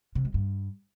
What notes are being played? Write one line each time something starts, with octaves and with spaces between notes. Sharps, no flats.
C3
G#3
G2